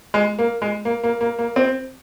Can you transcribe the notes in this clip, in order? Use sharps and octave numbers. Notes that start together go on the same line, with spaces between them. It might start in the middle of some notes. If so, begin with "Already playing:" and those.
G#3
A#3
G#3
A#3
A#3
A#3
A#3
C4